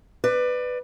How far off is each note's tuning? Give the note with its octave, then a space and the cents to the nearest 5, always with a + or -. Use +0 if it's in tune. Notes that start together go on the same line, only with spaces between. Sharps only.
B4 +10 D5 +25